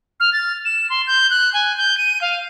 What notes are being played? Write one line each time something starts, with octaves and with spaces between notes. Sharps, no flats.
F6
A6
E7
C6
G6
F#6
G#5
G6
D#7
F5